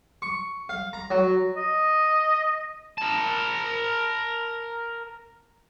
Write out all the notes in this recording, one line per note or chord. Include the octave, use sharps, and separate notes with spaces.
C#6
F5
A#5
F#3
D#5
A#4 A5